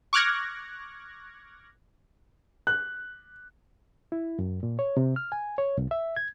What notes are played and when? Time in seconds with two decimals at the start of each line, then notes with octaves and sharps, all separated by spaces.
0.13 C#6 D6 F6 F#6 G#6 A#6
2.67 F#6
4.12 E4
4.39 F#2
4.63 A#2
4.79 C#5
4.97 C3
5.16 F6
5.32 G#5
5.58 C#5
5.77 C2
5.91 E5
6.16 G#6